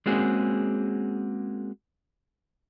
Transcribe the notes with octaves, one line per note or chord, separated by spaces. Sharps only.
G#3 A#3 C4 C#4 F#4 G#4